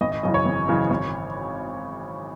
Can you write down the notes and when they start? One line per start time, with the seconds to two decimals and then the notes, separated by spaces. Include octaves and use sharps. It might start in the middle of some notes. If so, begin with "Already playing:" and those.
0.01 G#1 D#5
0.12 D#5
0.23 F#2 C#3 E3 D#5
0.34 C#5
0.46 G#1
0.68 F#2 C#3 E3
0.90 G#1